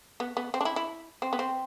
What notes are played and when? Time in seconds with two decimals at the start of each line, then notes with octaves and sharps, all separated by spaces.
0.20 B3
0.37 B3
0.54 C4
0.61 D4
0.65 E4
0.76 E4
1.22 C4
1.33 B3
1.39 C4